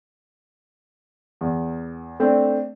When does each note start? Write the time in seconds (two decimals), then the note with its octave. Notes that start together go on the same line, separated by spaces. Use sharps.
1.41 E2
2.20 A3 C4 D4